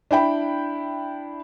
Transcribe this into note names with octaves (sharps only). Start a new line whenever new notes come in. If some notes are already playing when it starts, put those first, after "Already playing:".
D4 E4 G5 B5